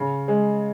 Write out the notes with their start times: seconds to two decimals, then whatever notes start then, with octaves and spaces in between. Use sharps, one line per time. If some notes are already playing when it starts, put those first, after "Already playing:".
Already playing: C#3
0.28 G#3